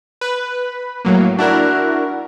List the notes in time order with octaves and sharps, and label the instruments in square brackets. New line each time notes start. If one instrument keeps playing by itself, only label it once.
[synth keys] B4 B5
A2 F#3 A#3
[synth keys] D4 E4 A#4 [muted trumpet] F#4